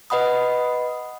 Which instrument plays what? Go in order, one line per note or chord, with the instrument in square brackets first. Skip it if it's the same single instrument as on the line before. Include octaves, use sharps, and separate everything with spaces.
[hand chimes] B4 D#5 F#5 B5 D#6